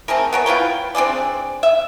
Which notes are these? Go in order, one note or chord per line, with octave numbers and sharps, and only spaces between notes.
A3 C4 G#4 A#4
B3 A#4 C#5
E4 F4 B4 G5
C4 D4 G#4 D5
E5